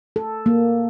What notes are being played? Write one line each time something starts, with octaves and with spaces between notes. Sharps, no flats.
A4
A#3